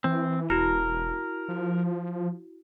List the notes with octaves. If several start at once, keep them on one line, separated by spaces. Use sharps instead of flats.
E3 C4
E1 E4 F#4 A#4
F3